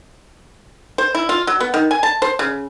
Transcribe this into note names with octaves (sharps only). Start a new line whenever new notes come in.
C5
E4
F4
F#3
B3
D#3
G#5
A5
C5
C#3